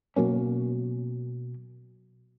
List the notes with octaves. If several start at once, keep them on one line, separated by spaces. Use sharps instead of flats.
B2 F#3 A#3 C#4